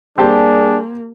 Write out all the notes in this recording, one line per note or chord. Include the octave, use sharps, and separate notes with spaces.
G3 A#3 C4 D4 G4 G#4 A5